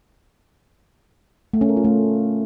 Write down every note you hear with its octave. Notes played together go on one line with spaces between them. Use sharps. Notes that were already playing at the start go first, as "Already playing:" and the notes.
A3
C#4
A#4
F4
A3